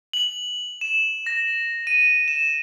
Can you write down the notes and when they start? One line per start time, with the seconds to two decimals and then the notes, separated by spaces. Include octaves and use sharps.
0.13 F#7
0.81 E7
1.26 A#6
1.87 D#7
2.28 E7